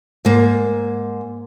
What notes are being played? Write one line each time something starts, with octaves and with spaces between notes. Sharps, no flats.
G#2 A#3